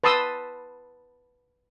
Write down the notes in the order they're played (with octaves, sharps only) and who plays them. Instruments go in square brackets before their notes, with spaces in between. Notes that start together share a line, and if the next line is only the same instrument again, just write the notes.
[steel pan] B4 A5 C6 D#6 E6